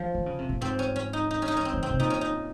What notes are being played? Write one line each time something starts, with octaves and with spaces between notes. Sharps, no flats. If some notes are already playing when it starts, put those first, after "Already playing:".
Already playing: F3
D#3
C#3
C3
A#2
G#2 C4
C#4
C#4
D#4
D#4
C#4
D#4
C#4
C4
D#3
C#3 C4
C3
A#2 D#4
C#4
D#4